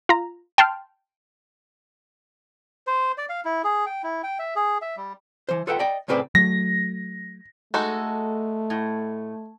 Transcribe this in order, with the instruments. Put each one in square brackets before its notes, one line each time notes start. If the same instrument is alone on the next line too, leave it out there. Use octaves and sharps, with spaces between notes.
[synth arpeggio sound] F4 A#5
G5 A5 C6 F6
[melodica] C5
D5
F5
E4
G#4
G5
E4
G5
E5
G#4
E5
G3
[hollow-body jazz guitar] E3 C5
F4 A4 B4 E5 F#5 G5
D5 D#5 G5
A2 C#3 C4 B4 C5 D5
[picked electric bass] F#3 A3 [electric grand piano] A#6
[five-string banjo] G#3 D#4 F#4 [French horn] A3 [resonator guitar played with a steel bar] A4
[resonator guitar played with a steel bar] A2